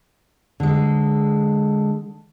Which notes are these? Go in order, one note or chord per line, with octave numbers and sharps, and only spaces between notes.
D3 G#3